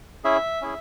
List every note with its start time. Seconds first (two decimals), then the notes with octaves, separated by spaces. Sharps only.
0.24 C#4 E4 G#4 E5
0.61 C#4 E4 G#4